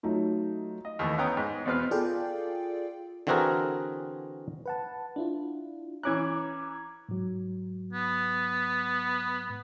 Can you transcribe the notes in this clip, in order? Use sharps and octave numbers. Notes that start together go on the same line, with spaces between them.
F#3 A3 D#4 F4
D#5
D#2 E3 A3
B3 C#4 B4 G5 A#5 D#6
G#2
E2 B2 C4 B4 F6
F4 G#4 A4 D5 F5 G5
D3 E3 C4 F#4 G#4 A#4
B4 F#5 A5
D4 E4 F4
E3 C#4 A#5 D6 F#6 G#6
G#2 F#3
B3
G#2